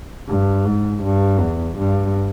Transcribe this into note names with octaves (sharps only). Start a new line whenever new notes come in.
G2
G#2
G2
E2
G2